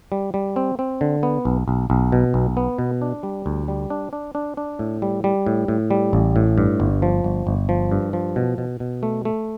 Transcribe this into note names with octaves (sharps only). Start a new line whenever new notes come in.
G3
G3
C4
C4
D3
B3
B1
B1
B1
B2
B1
B3
B2
D4
G3
D2
G3
D4
D4
D4
D4
A2
G3
G3
A2
A2
G3
A1
A2
G2
G1
F3
G1
G1
F3
G2
F3
B2
B2
B2
A3
A3